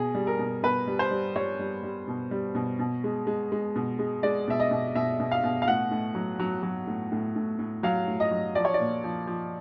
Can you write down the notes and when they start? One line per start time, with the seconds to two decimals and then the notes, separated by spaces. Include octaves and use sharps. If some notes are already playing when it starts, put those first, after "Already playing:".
Already playing: B2 G#4
0.15 G3
0.27 A#4
0.39 B2
0.63 B2 B4
0.87 G3
0.99 C5
1.11 G3
1.36 G3 C#5
1.59 G3
1.83 G3
2.08 B2
2.31 G3
2.55 B2
2.79 B2
3.04 G#3
3.27 G#3
3.52 G#3
3.76 B2
3.99 G#3
4.23 G#3 D5
4.48 B2 E5
4.60 D#5
4.71 B2
4.95 B2 E5
5.20 B2
5.31 F5
5.44 B2
5.62 F5
5.68 A2 F#5
5.91 A2
6.15 F#3
6.39 F#3
6.63 F#3
6.87 A2
7.12 A2
7.36 A2
7.59 A2
7.83 F#3 F5
8.08 A2
8.20 D#5
8.31 F#3
8.55 F3 D5
8.65 C#5
8.74 D5
8.80 A#2
9.04 F3
9.27 F3